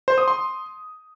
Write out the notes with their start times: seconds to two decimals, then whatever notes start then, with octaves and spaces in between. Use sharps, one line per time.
0.08 C5
0.18 D#6
0.28 C6